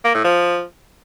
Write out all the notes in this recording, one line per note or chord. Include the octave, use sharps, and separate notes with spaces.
A#3
A2
F3